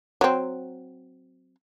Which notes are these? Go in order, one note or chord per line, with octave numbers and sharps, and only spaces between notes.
F#3 C4